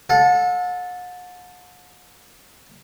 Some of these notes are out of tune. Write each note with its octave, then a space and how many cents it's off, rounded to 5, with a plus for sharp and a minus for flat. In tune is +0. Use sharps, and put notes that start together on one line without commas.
A4 -5 F#5 -45